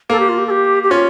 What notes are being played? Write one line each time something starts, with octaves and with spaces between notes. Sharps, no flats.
A#3 A4
G4
F4
G4
A4
G4
G4
C#4 F4